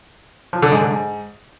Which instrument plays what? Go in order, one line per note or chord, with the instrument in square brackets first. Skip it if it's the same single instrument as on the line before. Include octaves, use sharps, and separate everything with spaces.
[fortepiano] F3
D3
G#2
D3
G#2